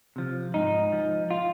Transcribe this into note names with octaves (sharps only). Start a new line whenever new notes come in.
C3 F3
G#2 D#4
F3
F4